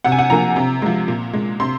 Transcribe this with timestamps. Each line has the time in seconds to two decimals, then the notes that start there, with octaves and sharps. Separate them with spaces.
0.04 C3 F#5
0.12 G#5
0.19 F#5
0.30 F3 A#3 A#5
0.56 C3
0.82 F3 G#3
1.08 A#2
1.33 G#3
1.60 C3 C6